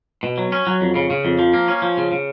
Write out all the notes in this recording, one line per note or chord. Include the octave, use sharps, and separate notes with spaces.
B2
F#3
C#4
F#3
F2
C#3
C#3
F2
F3
A#3
C#4
F3
C#3
C#3